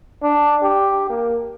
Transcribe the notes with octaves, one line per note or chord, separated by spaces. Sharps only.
D4
G4
A#3